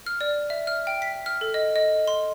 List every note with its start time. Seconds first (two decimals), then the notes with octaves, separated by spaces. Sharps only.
0.06 F6
0.21 D5
0.50 E5
0.67 F6
0.87 G5
1.02 B6
1.26 F6
1.41 A4
1.54 D#5
1.76 D#5
2.08 C6